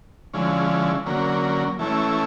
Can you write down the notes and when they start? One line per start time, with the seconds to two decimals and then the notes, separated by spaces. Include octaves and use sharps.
0.34 D3 F3 G#3 C#4 E4
1.06 D3 F#3 A#3 C#4
1.79 E3 A3 C#4 E4